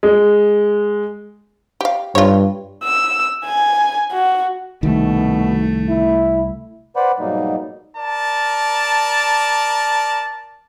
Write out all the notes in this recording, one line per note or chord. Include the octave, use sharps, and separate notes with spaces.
G#3
G4 F5
G2 F4 C#5
E6
G#5
F#4
C2 B2 D#3 A3
E4
B4 C5 D5 F#5 B5
G#2 B2 F#3 G3 A#3 D#4
A#4 D5 A5